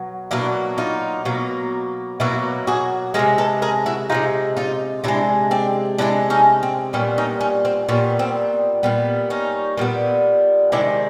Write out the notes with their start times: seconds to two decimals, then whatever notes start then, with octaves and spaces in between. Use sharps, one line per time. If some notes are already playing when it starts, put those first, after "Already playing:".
Already playing: B2 F#3
0.31 B2 F#3 A#3 D4 E4
0.78 D#4 F4
1.25 B2 F#3 A#3
2.20 B2 F#3 A#3 E4 F#4
2.67 F#4 G#4
3.14 C3 F3 G#3 G#4 A#4
3.38 A4 B4
3.62 G#4 A#4
3.86 E4 F#4
4.09 C3 F3 G#3 D#4 F4
4.57 D#4 F4
5.04 C3 F3 G#3 D4 E4
5.51 C4 D4
5.98 C3 F3 G#3 D4 E4
6.30 C#4 D#4
6.63 C4
6.93 A#2 G3 B3 C#4
7.18 C#4 D#4
7.41 C#4
7.65 C4
7.89 A#2 G3 B3 C#4
8.19 C4
8.83 A#2 G3 B3
9.30 C#4 D#4
9.77 A#2 G3 B3
10.72 C3 D#3 G#3 D4 E4